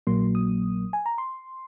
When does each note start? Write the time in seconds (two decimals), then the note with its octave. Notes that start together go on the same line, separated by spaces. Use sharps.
0.07 A#1 A#2 F#3 A#3 C6
0.35 D#6
0.93 G#5
1.06 A#5
1.18 C6